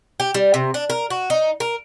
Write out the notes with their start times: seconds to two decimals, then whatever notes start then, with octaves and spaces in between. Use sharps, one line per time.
0.20 G4
0.34 G3
0.54 C3
0.74 D4
0.90 A#4
1.10 F#4
1.30 D#4
1.60 A#4